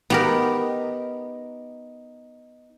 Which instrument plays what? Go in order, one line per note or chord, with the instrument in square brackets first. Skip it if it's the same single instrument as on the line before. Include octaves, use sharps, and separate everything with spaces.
[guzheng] B3 G4 A#4 [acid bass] D#4